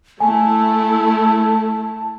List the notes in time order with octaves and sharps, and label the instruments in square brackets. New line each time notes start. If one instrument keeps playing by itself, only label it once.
[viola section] A3 E4 [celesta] G#5 [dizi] A5